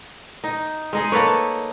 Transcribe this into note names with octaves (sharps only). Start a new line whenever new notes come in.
D#4
G#3 D#4 G#4
A#3 A4 B4 C#5